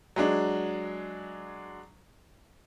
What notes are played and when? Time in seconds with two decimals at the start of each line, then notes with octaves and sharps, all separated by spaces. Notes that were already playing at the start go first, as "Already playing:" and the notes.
0.16 F#3 G#3 D4